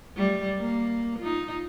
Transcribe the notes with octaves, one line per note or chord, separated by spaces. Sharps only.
G3 A3
A#3
D#4 F4